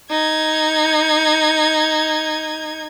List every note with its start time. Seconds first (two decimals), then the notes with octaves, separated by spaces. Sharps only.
0.10 D#4 G#6